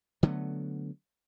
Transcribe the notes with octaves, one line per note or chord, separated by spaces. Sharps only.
D3 F#3 A3 B3